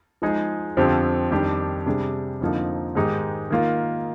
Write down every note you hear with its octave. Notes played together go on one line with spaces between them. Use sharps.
F3 G#3 D#4 G#4
F2 D3 F3 C4 G4
F2 D#3 G3 D4 G4
C3 G3 D4 G#4
F2 D3 F3 A#3 D#4
G#2 D#3 G#3 D#4 G4
D#3 A#3 F4